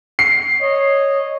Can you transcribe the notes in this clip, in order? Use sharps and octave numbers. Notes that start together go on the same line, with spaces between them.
C7
C#5 D#5